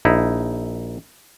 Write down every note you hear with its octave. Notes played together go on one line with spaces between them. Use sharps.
A#1 D#4 E4